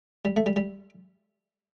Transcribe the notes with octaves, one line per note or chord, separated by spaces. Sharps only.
G3
A3
G3
G3